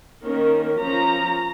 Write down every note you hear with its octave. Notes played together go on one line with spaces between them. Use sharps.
D#3 A#3 C#4 A#4
F3 C#4 A#5